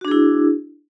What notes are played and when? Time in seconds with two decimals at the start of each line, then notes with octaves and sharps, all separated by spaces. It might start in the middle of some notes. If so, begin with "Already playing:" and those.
0.01 F#4
0.05 D4
0.08 G#4
0.11 E4